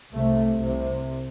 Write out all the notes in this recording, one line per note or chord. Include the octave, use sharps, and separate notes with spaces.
C2 C3 A3
C2 C3